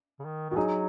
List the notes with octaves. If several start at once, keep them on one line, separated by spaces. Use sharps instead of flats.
C#3
D#3
D#3 F#4
F#3 D#4 G#4